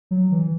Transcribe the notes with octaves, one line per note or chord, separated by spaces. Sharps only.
F#3
E3